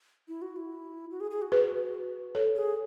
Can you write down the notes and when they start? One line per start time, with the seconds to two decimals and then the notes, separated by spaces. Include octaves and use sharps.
0.28 E4
0.42 F#4
0.56 E4
1.11 F#4
1.20 G#4
1.31 G#4
1.42 F#4
1.52 G#4 B4
2.35 A4 C#5
2.56 G#4